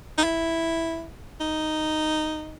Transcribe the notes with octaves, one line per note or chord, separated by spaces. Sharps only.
D#4
E4
D#4